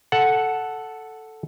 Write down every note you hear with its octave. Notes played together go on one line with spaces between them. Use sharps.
A4 F#5